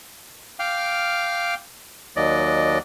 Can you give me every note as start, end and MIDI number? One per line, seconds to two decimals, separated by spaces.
0.59 1.55 77
0.59 1.55 79
0.59 1.55 86
0.59 1.55 89
2.16 2.78 39
2.16 2.78 54
2.16 2.78 74
2.16 2.78 75